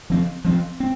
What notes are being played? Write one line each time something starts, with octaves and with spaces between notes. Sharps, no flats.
F3 C4
F3 C4
C4